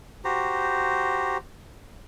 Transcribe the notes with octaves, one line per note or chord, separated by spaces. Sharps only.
F#4 G4 C5 A#5